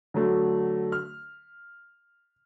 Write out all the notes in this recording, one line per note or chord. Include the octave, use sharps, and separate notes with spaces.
D3 F#3 A3
F6